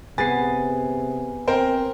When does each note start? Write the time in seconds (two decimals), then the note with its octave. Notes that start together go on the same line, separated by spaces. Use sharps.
0.18 C3 B3 G#4 B4 G#5 A6 C7
1.47 C4 A#4 C5 G5